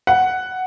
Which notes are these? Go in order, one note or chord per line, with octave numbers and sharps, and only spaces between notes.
F#5